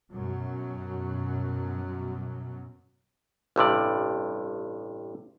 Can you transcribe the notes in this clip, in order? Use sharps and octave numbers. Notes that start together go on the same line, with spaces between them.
F#2 B2 F#3
A1 G2 C3 D5